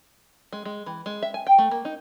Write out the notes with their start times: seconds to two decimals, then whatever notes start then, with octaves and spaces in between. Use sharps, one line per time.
0.53 G#3
0.65 G#3
0.86 E3
1.06 G#3
1.23 E5
1.34 G#5
1.47 G5
1.58 A3
1.71 A#3
1.85 D#4